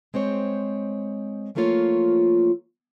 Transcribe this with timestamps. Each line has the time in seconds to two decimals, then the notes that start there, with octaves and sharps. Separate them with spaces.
0.14 G#3 C4 C5 C#5
1.55 E3 F3 A3 A#3 F4 C#5